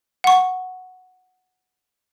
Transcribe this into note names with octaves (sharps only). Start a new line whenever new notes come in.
F#5 C#6